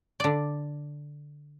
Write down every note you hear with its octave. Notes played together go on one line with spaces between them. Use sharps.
D3 D5